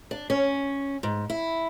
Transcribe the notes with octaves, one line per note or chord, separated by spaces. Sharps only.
D4
C#4
G#2
E4